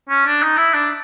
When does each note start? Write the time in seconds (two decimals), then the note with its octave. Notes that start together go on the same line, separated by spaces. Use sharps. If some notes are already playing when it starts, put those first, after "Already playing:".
0.09 C#4
0.26 D4
0.42 D#4
0.57 E4
0.73 D4